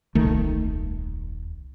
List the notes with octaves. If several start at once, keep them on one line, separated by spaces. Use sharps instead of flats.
D#1 C2 D#3 A3